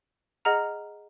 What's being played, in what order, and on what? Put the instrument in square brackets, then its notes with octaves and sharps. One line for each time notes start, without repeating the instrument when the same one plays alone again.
[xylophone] G#4 D#5 F#5 A#5 F6